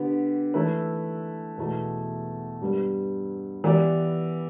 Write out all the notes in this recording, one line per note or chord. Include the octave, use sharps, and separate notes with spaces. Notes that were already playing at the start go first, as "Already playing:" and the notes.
Already playing: D3 B3 G4
E3 A3 E4 B4
E2 B2 A3 E4
G2 G3 B3
E3 B3 G4 D5